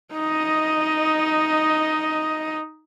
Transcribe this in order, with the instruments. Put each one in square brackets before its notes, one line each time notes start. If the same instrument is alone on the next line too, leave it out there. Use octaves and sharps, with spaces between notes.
[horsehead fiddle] D#4 D#5